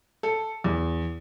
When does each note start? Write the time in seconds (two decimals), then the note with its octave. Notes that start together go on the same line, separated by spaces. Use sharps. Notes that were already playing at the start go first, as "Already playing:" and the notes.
0.23 A4
0.64 E2